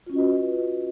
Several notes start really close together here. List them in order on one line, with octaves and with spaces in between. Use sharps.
F4 C#4 F#4 D#5 B4